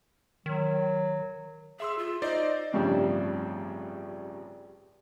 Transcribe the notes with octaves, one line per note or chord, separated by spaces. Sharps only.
D#3 F#3
G#4 E5 C6 E6
F4
D#4 C5 D5 D#5
A1 G2 C#3 F3 C4 D4